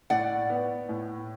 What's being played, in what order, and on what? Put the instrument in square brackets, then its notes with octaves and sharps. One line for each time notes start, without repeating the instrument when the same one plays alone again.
[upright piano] A2 [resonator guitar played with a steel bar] D5 F#5
[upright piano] B3
A2